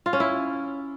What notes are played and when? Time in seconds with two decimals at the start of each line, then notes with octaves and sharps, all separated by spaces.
0.06 F4
0.13 C#4
0.20 E4